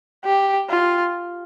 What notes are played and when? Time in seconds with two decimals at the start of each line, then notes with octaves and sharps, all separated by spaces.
0.25 G4
0.70 F4